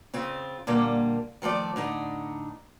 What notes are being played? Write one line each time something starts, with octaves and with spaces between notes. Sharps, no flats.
C#3 C4 F4
A#2 D3 G3 A#3
D#3 F3 A3 D5
A2 D3 D#4